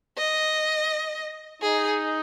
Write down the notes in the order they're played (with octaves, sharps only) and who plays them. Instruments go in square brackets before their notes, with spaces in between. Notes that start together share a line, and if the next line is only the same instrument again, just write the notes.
[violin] D#5
[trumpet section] D#4 [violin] G#4